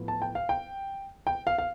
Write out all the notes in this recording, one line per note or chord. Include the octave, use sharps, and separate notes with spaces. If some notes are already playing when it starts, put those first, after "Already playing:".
Already playing: A2 F3 B3
A5
G5
F5
G5
G5
F5
F5